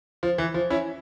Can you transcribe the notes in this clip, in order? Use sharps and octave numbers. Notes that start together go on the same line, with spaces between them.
F3
E3
F3
C#4 E4